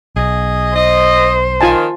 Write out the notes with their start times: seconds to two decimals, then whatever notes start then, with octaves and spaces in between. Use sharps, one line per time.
0.16 B1 G#4 D#5
0.75 C5 D#5
1.61 D#3 F4 G#5 A5